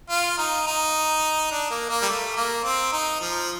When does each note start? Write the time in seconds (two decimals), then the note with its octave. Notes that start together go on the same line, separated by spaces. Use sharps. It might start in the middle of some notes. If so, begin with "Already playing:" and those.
0.10 F4
0.38 D#4
0.67 D#4
1.51 D4
1.70 A#3
1.89 A#3
2.02 G3
2.08 A3
2.36 A#3
2.64 C4
2.92 D#4
3.20 F3